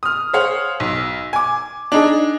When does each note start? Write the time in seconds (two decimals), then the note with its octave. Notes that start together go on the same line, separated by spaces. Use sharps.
0.03 D#6 F6
0.33 G#4 C5 C#5 F5 F#5
0.80 B1
1.33 G#5 D6
1.92 D4 D#4 G#4